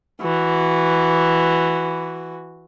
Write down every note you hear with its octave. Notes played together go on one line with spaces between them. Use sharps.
E3 F#4